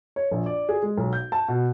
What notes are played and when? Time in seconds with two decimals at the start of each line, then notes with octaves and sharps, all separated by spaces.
0.16 C#5
0.31 A#1
0.46 D5
0.69 G#4
0.82 G#3
0.97 B1
1.13 G6
1.32 A5
1.48 B2